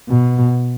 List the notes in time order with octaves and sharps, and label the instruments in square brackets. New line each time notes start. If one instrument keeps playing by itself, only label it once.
[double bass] B2